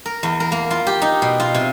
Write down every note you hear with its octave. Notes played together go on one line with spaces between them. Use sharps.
A#4
E2
A#4
A#3
F4
G4
D#4
B2
F4
C3